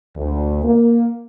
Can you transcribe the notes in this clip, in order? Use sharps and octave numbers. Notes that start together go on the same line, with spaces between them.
D2
A#3